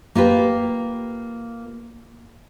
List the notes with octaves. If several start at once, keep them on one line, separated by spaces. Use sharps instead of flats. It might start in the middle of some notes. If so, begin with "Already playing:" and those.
A#3 F4 G4 B4